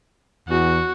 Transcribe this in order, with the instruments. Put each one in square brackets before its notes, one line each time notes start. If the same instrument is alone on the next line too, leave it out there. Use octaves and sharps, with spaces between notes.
[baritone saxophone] E2 [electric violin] F#4